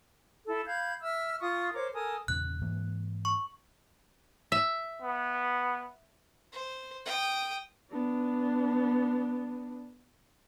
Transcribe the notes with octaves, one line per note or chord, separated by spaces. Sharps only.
E4 A4
F5 B5 G6 G#6
E5 E6 F6
F4 C#6 D#6
A#4 C5 C#5 D6
A4 A#4 G#5 D#6
E2 A#2 C#3 F#6
G#2 E3 A#3
C#6
E5
B3
C5
G5 D#6
B3 D4